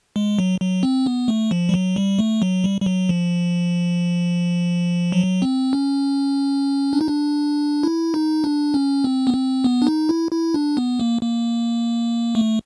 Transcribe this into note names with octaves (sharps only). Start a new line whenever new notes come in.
G#3
F#3
F#3
C4
B3
A3
F3
G3
F#3
G3
A3
F#3
G3
G3
F#3
F3
F#3
C4
C#4
D4
D#4
D4
E4
D#4
D4
C#4
C4
B3
C4
B3
D4
D#4
E4
E4
D4
B3
A#3
A#3
A3